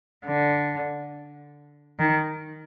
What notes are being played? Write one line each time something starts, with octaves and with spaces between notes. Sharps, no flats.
D3
D#3